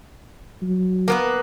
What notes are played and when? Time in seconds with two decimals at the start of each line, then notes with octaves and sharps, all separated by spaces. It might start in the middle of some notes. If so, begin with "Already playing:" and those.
0.62 F#3
1.08 A#3 B3 B4